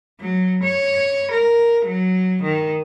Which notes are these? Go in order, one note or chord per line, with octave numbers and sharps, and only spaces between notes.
F#3
C#5
A#4
F#3
D#3